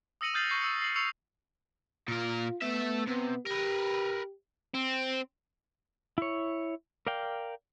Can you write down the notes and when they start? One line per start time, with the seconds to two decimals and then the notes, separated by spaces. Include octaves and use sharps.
0.21 D#6 E6 A#6 C#7 D#7 F#7
0.34 D#6 F6 G6 A6 C7 F#7
0.49 C#6 G6 C7
0.61 E6 C#7
0.81 C7 F#7
0.96 C#6 E6 C7 C#7 F7
2.08 A#2 F4 A#4
2.62 A3 B3 E5
3.07 C3 B3
3.46 G4 A#4 B4
4.74 C4
6.18 E4 C#5
7.07 A#4 D5 F5 G5